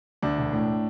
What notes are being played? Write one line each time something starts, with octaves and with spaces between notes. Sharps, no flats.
D2 D4
E1
A2